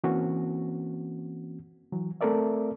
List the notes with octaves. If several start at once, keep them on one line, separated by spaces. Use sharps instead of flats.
E3 A#3 C4 C#4 F#4
E3 F#3
A3 C4 A4 A#4 D5 E5